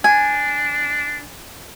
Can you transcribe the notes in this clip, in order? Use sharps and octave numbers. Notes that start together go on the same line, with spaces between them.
D4 G#5